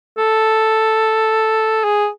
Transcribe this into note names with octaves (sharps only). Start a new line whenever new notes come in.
A4
G#4